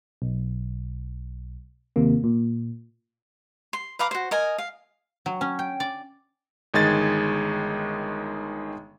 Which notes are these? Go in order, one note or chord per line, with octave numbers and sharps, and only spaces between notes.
B1
D#2 C3 A#3
A#2
C6
B4 F5 A#5 D6
F#4 C5
A#4 D#5 G#5
F5
F#3
C#4
G5
D5
G1 D#3 G#3 G#6 A6